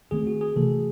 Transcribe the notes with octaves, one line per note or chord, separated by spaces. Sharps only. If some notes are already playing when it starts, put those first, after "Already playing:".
D#3 A3 C4 G#4
F#4
G#4
C3 E3 A3 A4